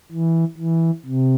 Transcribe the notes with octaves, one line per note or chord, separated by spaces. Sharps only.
E3
E3
C3